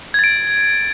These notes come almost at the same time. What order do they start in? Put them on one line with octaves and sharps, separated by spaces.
G#6 A6 D7